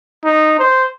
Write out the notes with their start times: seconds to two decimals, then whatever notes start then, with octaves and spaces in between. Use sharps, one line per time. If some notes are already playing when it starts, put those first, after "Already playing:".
0.25 D#4
0.59 C5